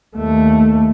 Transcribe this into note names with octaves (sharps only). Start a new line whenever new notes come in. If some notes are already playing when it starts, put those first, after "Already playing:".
D#2 A3